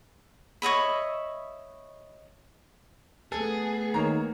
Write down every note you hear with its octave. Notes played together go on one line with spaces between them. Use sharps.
C#5 D#5 E5 B5
A3 B3 G#4 A4
D#3 A#3 C#5 A#5